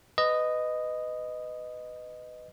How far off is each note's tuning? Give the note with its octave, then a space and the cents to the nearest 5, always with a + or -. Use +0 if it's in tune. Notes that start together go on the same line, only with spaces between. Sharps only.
B4 +20 D#5 -5